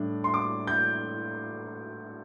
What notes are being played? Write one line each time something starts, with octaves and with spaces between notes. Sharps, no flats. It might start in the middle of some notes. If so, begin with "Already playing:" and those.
Already playing: A2 G3 D4
C6
D6
G6